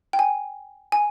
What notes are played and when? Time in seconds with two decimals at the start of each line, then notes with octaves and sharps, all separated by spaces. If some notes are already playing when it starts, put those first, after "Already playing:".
0.13 G5
0.19 G#5
0.92 G#5